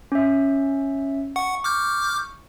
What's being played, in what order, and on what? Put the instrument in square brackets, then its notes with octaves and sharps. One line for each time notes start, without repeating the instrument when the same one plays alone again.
[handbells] C#4 E5
[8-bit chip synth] F#5 [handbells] C#6
[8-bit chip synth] D6 F6 G6